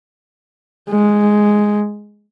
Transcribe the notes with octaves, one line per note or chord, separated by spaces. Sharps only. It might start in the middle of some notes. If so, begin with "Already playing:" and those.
G#3